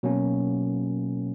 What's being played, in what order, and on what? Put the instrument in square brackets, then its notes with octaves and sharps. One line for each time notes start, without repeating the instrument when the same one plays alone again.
[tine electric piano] B2 F#3 A#3 C#4